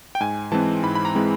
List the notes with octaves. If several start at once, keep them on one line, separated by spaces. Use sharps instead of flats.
G5
G#2 G#5
E3 G#3 C4 A5
G#2 B5
B5
A#5
E3 G#3 C4